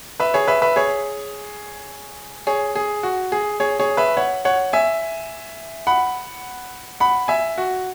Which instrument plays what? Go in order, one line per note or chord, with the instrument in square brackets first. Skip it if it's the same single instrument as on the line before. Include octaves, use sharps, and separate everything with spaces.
[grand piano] B4 E5
G#4 C#5
B4 E5
B4 E5
G#4 C#5
G#4 C#5
G#4
F#4
G#4
G#4 C#5
G#4 C#5
B4 E5
C#5 F#5
C#5 F#5
E5 G#5
F#5 B5
F#5 B5
E5 G#5
F#4